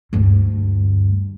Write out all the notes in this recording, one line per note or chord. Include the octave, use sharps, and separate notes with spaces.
D2 G2